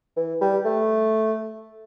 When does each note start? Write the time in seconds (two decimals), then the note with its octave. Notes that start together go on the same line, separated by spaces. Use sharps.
0.17 E3
0.41 G3
0.65 A3